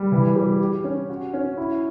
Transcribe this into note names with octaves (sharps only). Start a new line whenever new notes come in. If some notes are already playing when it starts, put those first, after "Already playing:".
Already playing: G3
E3
G3
G4
C#4
F#4
C#4
E4